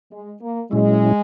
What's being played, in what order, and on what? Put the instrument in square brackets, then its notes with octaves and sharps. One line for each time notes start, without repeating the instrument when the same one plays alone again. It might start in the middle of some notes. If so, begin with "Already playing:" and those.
[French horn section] G#3
A#3
[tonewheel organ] A#2 F#3 C#4 E4 [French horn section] G#3